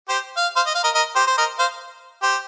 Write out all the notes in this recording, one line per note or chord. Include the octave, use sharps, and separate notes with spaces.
G4 C5
F5
C5 F5
D#5
F5
A#4 D#5
A#4 D#5
G4 C5
C5
A#4 D#5
C5 F5
G4 C5